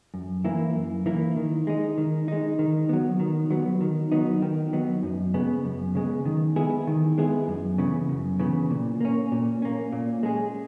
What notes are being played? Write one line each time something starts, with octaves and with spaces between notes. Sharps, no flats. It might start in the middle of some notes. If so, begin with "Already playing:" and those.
F#2
E3 A#3 E4
F#2
E3 A#3 E4
D#3
G#3 D#4
D#3
G#3 D#4
D#3
F#3 B3
D#3
F#3 B3
D#3
F#3 B3 D#4
D#3
F#3 B3 D#4
F#2
C#3 G#3 B3
F#2
C#3 G#3 B3
D#3
G#3 B3 E4 G#4
D#3
G#3 B3 E4 G#4
F#2
C#3 E3 B3
F#2
C#3 E3 B3
A#2
A#3 C#4
A#2
A#3 C#4
A#2
G#3 C#4 G#4